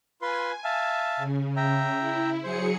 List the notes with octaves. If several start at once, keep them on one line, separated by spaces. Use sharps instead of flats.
F4 B4 G#5 C6
E5 F5 A5
C#3
E5 G5 A#5
E4
F#3 G#4 C5 C#7